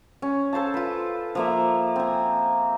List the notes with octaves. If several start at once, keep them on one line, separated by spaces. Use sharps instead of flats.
C#4
A4 C5 F5 A5
F4 B4
F3 A#3 E5
C4 G#5